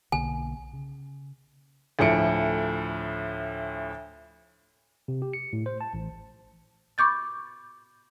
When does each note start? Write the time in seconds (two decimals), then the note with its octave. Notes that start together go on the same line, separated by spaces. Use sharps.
0.12 B1 D3 A#3 G#5
0.73 C#3
1.99 D2 A2 F3 C#7 D7
5.08 C3
5.22 G4
5.33 C#7
5.53 A2
5.66 C5
5.81 A5
5.94 A1
6.98 B5 C#6 D6 G6 A6